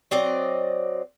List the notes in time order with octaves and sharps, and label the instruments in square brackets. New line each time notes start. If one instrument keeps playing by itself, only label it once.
[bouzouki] F#3 C4 D5 D#5